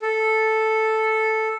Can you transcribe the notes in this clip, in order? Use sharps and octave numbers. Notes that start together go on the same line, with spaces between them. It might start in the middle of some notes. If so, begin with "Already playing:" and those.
A4